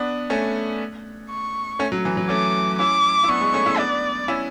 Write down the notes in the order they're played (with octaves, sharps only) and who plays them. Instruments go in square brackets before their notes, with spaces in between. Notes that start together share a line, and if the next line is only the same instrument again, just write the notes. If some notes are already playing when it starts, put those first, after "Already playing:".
Already playing: [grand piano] B3 D4
A3 C#4
[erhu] C#6
[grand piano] A3 C#4
F#3
E3
F#3
[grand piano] A3 C#4 [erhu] D6
[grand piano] C#4 E4 [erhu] D6
[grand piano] E4
[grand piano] B3 D4 [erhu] C#6
[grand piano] G#3 B3
A3 C#4
C#4 E4
[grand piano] B3 D4 [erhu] D5
[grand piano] C#4 E4